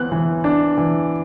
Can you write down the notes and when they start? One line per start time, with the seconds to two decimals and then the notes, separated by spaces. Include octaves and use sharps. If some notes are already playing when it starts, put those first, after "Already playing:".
Already playing: E3 B3 F#6
0.12 E3
0.44 D4
0.78 E3